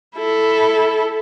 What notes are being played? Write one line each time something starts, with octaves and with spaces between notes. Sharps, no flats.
E4 A4